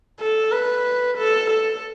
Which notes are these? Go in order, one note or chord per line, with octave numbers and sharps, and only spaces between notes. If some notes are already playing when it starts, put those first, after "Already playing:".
A4
B4
A4
A4